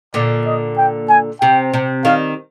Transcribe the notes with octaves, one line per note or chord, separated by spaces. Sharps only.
A#2 D3 D5
D#5
G5
G#5
C3 G5
C3
D#3 G3 F5